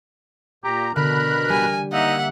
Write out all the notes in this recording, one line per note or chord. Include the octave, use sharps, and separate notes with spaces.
A#2 G4 A#5
B2 D3 A#4 B5 F#6
G3 G#5
A#3 D#4 E5 F#5